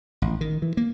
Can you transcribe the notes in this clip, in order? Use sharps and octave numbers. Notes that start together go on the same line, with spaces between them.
A1
D#3
E3
A#3